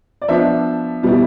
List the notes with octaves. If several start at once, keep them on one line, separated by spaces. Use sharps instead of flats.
D5
F3 B3 D4 C5 E5
B2 G3 B3 E4